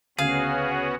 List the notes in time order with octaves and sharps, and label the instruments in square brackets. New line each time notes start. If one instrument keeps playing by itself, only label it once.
[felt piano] D2 C#3 G#6 [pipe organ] B3 C#4 F#4 [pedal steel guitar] G#4 [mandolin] F5